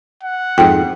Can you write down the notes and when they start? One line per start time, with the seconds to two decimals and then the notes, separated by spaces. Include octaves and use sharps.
0.23 F#5
0.58 F2 G#2 G5